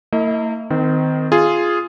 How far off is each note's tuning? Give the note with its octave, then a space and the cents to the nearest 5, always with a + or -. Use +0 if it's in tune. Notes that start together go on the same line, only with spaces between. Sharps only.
A#3 -45 E4 -20 D#5 +35
D#3 +0 C4 -30 D#5 +0
F4 -5 G#4 +0